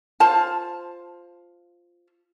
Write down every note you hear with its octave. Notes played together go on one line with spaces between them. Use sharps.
F4 C5 A5